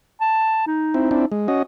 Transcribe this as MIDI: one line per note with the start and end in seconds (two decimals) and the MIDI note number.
0.21 0.63 81
0.67 1.27 63
0.94 1.10 60
0.94 1.10 64
1.11 1.25 60
1.11 1.25 62
1.11 1.25 64
1.32 1.47 56
1.48 1.62 61
1.48 1.62 66
1.48 1.62 75